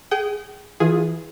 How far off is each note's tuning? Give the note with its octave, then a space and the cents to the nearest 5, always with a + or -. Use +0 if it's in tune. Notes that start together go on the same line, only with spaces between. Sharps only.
G#4 +0 G5 -35
E3 +0 F4 +20 G#4 +0